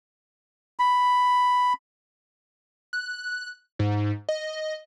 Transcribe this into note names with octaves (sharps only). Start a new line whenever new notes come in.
B5
F#6
G#2
D#5